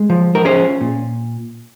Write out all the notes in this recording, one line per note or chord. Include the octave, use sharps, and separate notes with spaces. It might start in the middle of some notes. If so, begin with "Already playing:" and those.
Already playing: G#3
F3
A#4
C#4 G#4 C5
A#2